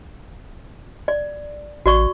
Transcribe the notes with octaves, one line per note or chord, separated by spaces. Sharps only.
D5
A1 F#4 D5 C#6